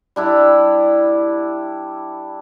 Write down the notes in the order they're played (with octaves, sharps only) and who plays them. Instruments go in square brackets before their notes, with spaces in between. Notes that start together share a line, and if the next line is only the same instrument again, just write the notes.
[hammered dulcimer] G3 D4 E4